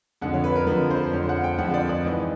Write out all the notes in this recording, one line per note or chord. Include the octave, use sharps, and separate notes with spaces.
F2 D3 F3 F#5
C#5
B4
A#4
F2 D3 F3 B4
C5
F2 D3 F3 C#5
F#5
G5
F2 D3 F3 F#5
D5
D5
G#2 E3 D#5